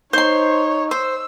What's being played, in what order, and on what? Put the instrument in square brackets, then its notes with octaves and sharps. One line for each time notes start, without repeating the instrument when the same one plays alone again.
[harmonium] D#4 [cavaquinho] C5 C6 [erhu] C#5
[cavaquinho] C5 [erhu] E6